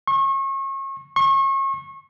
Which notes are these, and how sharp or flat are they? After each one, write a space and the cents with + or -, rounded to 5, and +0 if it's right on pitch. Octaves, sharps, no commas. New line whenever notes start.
C#6 -35
C#6 -35